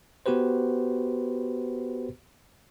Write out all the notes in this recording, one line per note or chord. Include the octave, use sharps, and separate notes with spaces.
B3 F#4 G4 B4 C5